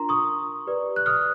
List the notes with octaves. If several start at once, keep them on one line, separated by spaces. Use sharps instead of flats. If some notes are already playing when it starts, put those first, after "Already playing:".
Already playing: D4 F4 A#4 A#5 C6
C#6 D#6
G4 B4 D5
F#6
D#6 F6